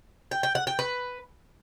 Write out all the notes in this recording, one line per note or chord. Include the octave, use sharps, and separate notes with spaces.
G5
G5
F#5
G5
B4